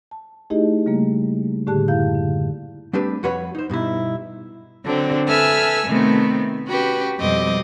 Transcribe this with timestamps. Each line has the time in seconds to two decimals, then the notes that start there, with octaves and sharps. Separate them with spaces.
0.11 A5
0.50 A3 D#4 E4 G4 G#4 D#5
0.86 C#3 G3 A3 A#3
1.67 A2 D3 G4 G#4 A5 F#6
1.88 F#2 D3 E4 F5 G6
2.15 D3
2.93 G3 A3 C4 D4 G4 B4
3.23 F2 F#4 B4 C#5 B5
3.55 D#4 C5
3.70 G2 B2 D#4 E4
4.84 D3 F#3 C4 D4
5.29 A4 B4 E5 G#5 E6 F6
5.87 C3 D#3 A3 B3 C4
6.67 C#4 F#4 G4 B4
7.19 F2 B2 G3 C4 D#5 D6